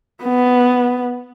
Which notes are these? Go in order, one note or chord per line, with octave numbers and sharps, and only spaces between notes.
B3